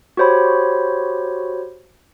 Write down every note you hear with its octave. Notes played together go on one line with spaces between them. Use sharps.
F#4 G4 C5 C#5 B5